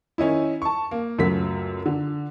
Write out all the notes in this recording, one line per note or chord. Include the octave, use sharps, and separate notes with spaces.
D#3 C#4 D#4 E4
A5 C#6
A#3
C#2 F#2 F#3 A3 B6
D3